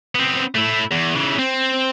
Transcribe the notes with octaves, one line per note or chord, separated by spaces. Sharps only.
B3 C4
A3 E4
E2
C#3 E3
C4